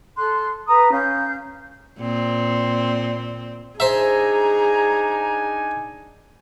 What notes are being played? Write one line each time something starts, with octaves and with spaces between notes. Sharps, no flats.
A4 C6 F#6
B4 A#5 D#6
C#4 F5 G6
A#2 C4
D4 D#4 G#4 C5 E5 G#5 A#5